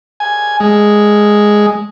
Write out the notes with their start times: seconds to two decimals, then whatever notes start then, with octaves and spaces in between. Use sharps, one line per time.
0.20 G#5
0.60 G#3